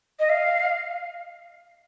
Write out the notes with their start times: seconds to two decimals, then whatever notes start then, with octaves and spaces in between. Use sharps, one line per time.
0.20 D#5
0.29 F5